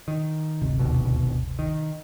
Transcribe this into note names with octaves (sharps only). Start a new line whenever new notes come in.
D#3
D1 G1 C3
E1 D#2 B2
D#3